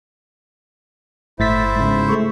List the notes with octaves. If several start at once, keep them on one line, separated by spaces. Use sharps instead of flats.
G1 A2 E4 C5 E5 A6 B6
G#2 C#3
A3 G#4 C#6